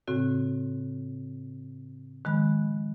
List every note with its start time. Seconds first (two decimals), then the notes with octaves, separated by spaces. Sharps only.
0.08 A2 C#3 C4 F#4
2.25 D#3 F3 G#3 B5 F#6